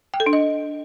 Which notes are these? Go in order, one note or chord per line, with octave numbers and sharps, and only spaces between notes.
G5
A4
D4
D#5